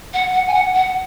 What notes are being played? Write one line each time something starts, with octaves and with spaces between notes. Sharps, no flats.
F#5
F#5
G#5
F#5
F#5